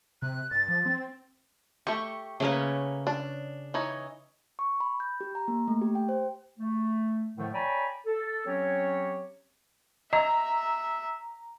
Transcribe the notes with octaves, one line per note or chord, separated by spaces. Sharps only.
C3 F#6
G2 A6
F3
C4
A3 G4 C#6
C#3 A3 A#3 C#4 B4
D4
E3 D#4 C#5
C#6
B5
G6
G4
A#5
A#3
A3
G4
G5
C5
A3
A2 D3 D#3 F3 A3
C#5 D5 G5 G#5 A#5 B5
A4
F#3 C4 C#4 G4 C#5
D#5 E5 A#5